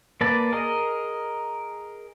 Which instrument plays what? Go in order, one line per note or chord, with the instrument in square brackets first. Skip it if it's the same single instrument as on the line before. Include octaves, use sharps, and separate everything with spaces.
[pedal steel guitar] A#3 B4 D5 A5
G#4 A#4 D#5